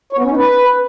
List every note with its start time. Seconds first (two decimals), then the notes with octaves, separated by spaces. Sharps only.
0.13 C#5
0.19 B3
0.25 C#4
0.31 D#4
0.37 B4